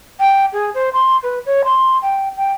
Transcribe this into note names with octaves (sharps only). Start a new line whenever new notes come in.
G5
G#4
C5
C6
B4
C#5
C6
G5
G5